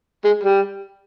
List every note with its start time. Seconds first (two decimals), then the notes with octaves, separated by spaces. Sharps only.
0.24 G#3
0.43 G3